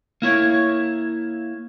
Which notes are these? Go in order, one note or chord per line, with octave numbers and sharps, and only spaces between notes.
A#3 E4 C#5